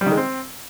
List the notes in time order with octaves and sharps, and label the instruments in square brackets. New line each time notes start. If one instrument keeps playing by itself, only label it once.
[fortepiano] G3
D#3
G#3
C4